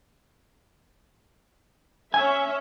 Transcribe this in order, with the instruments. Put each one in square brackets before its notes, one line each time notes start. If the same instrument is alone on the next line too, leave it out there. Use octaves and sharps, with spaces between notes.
[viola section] C#4 E5 [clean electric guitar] G#5